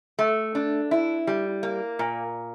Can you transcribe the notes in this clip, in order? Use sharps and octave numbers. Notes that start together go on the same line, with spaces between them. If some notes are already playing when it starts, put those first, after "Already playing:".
A3
D4
E4
G3
A#3
A#2